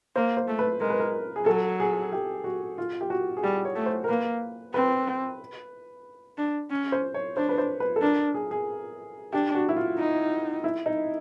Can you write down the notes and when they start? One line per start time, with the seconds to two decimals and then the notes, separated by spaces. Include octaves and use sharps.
0.16 A#3 C5
0.37 C5
0.48 A3
0.59 B4
0.80 G#3 A#4
0.90 B4
1.00 A#4
1.36 G#4
1.46 F#3 A4
1.80 G#4
2.12 G4
2.44 F#4
2.78 F4
3.01 G4
3.10 F#4
3.37 G#4
3.43 G3 G4
3.65 C#5
3.76 A3
3.86 C5
4.04 A#4
4.09 A#3 B4
4.74 C4 B4
6.38 D4
6.71 C#4
6.92 C5
7.14 C#5
7.37 D4 C5
7.49 B4
7.58 C5
7.80 B4
7.96 A4
8.01 D4 A#4
8.34 G#4
8.51 G#4
9.33 D4 G4
9.55 F#4
9.69 E4
9.76 F4
9.98 D#4
10.64 E4
10.86 D#4